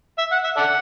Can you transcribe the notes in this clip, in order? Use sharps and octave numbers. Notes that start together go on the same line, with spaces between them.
E5
F#5
E5
A4 D5 F#5